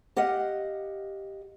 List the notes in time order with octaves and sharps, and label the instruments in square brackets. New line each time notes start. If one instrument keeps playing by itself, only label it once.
[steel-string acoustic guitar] G4 D#5 F5 F#5